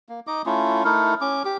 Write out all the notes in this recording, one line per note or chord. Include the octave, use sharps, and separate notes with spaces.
A#3
D#4 D#5 D6
A3 C#4 E4 F4
A3 D#4 E4 A#4
C#4 D6
G4 D6